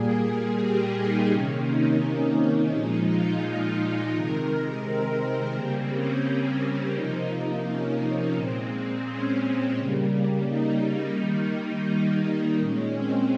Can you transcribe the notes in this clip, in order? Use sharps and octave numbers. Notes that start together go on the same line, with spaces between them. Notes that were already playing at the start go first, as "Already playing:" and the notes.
Already playing: A#2 G3 A#3 G#4
G4
D#4
C3 D#3 A#3 C#4
D#4
A#2 F3 G#3 D#4
F4
D#4
C3 D#3 G#3 A#4
C4
C#3 G3 A#3 C4
C#4
C#4
C3 F3 A#3 D#4
D#4
C#4
A#2 G#3 C4
C#4
C#3 G3 A#3
D#4
D#3 G3 A#3 D#4
D#4
A#2 G#3 C#4
C4